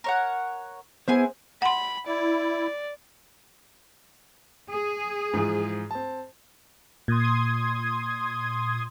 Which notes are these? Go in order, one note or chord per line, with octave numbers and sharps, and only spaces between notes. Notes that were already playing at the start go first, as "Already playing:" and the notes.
A#4 C#5 F#5
B3 E4 G#4 C5 G#5
F#5 B5 C6
E4 D5
G#4
G#2 E3 F3
C4 A5
A#2 C6 D#6 G#6